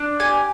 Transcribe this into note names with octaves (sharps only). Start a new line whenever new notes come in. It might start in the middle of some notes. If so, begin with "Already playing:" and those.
Already playing: D4
G4 G#5